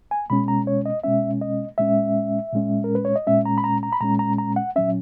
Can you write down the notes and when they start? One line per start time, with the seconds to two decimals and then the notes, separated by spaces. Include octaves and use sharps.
0.11 G#5
0.30 B2 G#3 C#4 B5
0.48 A#5
0.67 C#5
0.86 D#5
1.03 B2 G#3 C#4 E5
1.41 D#5
1.78 A#2 G#3 C#4 E5
2.53 A#2 G#3 C#4
2.84 A#4
2.95 B4
3.05 C#5
3.16 D#5
3.27 A#2 G#3 C#4 E5
3.45 A#5
3.58 B5
3.64 A#5
3.83 A#5
3.93 B5
4.01 A#2 G#3 C#4 A#5
4.19 A#5
4.38 A#5
4.56 F#5
4.76 A#2 F#3 C#4 E5